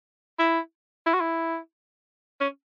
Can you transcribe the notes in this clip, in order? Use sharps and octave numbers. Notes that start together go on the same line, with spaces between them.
E4
E4
F#4
E4
C#4